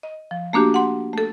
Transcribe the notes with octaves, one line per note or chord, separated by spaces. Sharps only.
D#5
F3
A3 A#3 D4 F#4 G4
F#5 C6
A3 A4